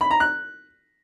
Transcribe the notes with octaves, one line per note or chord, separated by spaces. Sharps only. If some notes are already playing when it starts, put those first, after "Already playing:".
B5
A#5
F#6